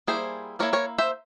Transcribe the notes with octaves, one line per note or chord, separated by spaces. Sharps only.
G3 A#3 E4 G#4 C5
G3 A#3 E4 A#4 C#5
A#4 C#5
C5 E5